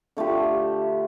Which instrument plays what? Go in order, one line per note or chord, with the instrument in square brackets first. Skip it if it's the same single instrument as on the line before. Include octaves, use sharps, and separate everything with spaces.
[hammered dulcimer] D3 A3 F4 G4